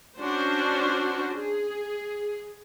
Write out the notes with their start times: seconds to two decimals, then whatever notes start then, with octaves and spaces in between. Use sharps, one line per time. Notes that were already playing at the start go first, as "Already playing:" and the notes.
0.17 C#4 D4 F#4 C5
1.35 G#4